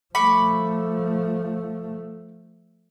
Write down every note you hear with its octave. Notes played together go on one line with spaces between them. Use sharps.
F3 A3 B5 C#6 D6